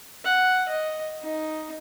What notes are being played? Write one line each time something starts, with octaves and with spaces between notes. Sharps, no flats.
F#5
D#5
D#4